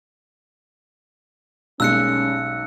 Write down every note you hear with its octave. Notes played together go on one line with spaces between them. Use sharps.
B1 G3 G#3 A#3 C#4 E6 F#6 C#7